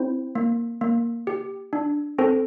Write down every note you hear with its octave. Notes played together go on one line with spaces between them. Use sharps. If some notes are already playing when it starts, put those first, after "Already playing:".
Already playing: C4 E4 C5
A#3
A#3
G4
D4
C4 A4 C5